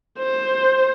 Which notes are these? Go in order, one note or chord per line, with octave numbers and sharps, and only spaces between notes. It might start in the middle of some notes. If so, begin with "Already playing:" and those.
C5